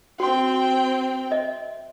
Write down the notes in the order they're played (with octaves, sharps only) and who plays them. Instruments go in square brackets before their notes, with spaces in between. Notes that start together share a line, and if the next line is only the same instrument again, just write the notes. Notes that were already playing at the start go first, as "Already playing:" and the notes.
[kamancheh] C4 G5 [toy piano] F#4 C6
[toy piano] D#5 E5